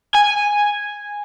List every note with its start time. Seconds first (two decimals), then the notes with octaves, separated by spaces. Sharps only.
0.15 G#5